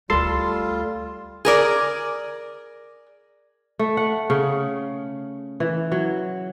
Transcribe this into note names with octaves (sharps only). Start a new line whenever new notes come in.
D2 G3 A3 F4 A4 C6
G#4 A#4 D5
A3
F#5
C#3
E3
F#3